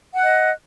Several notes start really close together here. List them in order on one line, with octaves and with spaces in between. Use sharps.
F#5 F#6 D#5